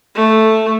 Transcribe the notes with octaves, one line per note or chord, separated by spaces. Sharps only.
A3